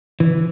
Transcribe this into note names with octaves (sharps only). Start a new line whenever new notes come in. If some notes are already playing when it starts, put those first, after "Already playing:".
E3